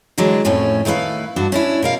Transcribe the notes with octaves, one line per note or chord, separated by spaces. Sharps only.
D3 E3 F#3 G#3 D4
F2 A2 A3 C#4
D#3 A3 E4 B4 F5
G2 D4 F#4
C#4 D4 E4
B2 A#4 F5